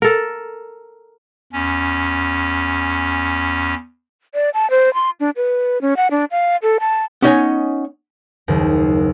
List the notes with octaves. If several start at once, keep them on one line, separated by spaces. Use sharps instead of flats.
A4 A#4
E2 C#4
D5
A5
C5
C6
D4
B4
C#4
F#5
D4
F5
A4
A5
B3 C#4 D#4 C#5 D#5 G#5
F#1 D#2